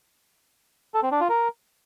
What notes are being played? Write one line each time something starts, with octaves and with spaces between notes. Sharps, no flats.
A4
C4
D4
F4
A#4